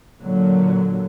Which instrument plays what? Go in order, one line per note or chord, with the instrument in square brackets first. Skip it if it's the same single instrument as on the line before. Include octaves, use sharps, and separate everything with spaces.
[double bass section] A#2 D3 F#3